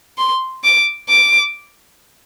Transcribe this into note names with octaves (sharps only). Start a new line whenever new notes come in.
C6
D6
D6